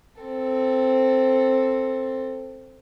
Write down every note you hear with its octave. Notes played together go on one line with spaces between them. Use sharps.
C4 A4